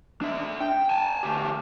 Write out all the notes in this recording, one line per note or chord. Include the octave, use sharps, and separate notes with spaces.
D4 E5
G5
G#5 A5
D2 G4